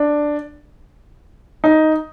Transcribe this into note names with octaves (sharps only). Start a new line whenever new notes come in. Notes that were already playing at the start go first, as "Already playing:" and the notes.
Already playing: D4
D#4